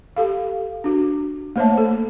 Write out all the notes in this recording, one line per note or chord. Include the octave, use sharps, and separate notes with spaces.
G4 A4 F5
D4 F#4
A3 A#3 C5 C#5 E5 A5
A4